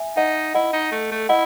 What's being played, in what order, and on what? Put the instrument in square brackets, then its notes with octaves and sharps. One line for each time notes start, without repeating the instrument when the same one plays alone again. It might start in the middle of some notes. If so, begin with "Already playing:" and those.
Already playing: [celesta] E5 G#5
[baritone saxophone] D#4 [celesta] D#5 F#5
[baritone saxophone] E4 [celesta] D#5 F#5
[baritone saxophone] D#4
A3
A3
[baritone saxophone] E4 [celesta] D#5 F#5